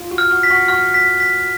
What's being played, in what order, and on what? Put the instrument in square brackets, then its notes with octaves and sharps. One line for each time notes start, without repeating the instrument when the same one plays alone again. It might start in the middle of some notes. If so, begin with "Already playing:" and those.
Already playing: [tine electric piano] F4
F#4
[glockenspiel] F6
[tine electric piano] F#4
[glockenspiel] B6
[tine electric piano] F#4
[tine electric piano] F#4 [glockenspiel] F6
[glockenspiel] B6
B6